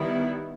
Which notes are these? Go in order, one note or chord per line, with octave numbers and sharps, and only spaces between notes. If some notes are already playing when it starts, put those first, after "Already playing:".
Already playing: D#3 G3 B3 E4